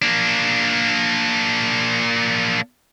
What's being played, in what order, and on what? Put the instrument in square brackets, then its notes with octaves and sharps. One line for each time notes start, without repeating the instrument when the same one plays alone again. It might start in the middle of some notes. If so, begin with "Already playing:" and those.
[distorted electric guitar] A#3 D4